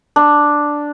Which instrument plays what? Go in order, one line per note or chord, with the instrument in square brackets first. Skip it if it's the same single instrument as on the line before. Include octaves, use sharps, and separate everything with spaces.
[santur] D4